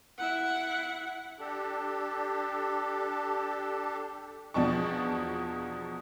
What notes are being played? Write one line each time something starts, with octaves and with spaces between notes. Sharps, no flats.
E4 F#5
D4 G4 A4
E2 B2 F3 D4 A5 C#6